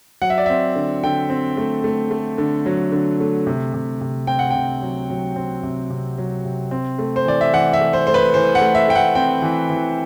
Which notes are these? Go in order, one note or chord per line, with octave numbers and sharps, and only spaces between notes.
F#3 F#5
E5
D5
C4 E5
D3
D3 G5
C4
A3
A3
A3
D3
F#3
D3
A3
C3
C3
C3
C4 G5
F#5
C3 G5
F#3
F#3
C4
C3
C3
F#3
C3
C4
A3
C5
E3 D5
E5
E3 F#5
E5
A3
C5
A3 C5
B4
E3 C5
F#5
A3
E5
A3 G5
F#5
C4 G5
E3
E3